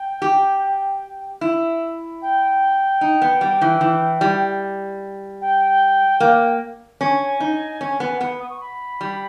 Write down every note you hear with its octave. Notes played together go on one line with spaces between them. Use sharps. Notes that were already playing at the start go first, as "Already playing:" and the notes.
Already playing: G5
G4
E4
G5
D#4
B3
G3
E3
E3
G3
G5
A#3
C#4 G#5
D#4
C#4
B3
B3
D#6
C#6
B5
G3